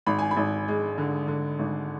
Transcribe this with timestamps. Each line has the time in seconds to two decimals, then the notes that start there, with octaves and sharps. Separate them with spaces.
0.06 G#1 B5
0.19 G#5
0.31 B5
0.37 G#1
0.68 G#3
0.98 D3
1.28 D3
1.59 G#1